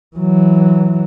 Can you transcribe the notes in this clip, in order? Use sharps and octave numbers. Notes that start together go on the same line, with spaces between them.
E3 F#3